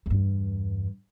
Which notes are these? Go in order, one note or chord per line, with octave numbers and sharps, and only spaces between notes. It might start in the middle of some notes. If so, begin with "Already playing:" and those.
E2 G2